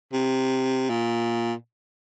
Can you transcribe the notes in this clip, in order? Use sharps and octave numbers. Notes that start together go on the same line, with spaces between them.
C3
A#2